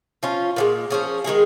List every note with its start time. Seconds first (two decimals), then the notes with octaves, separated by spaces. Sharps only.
0.23 F3 C#4 F4
0.56 A#2 F3 G#3
0.90 F3 C#4 G#4
1.24 D#3 G#3 D#4 G#4